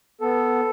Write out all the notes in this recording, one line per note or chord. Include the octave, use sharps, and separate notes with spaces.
B3 A4